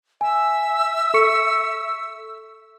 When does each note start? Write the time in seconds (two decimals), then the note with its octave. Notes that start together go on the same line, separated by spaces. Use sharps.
0.21 E5 G#5 E6
1.14 A4 C#6 C#7